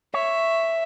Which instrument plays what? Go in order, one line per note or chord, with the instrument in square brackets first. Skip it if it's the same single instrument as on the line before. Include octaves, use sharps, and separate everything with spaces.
[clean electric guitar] C#5 [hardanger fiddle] E5